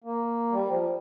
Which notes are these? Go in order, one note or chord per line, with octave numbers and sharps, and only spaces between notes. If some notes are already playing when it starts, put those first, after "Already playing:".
A#3
G3
F3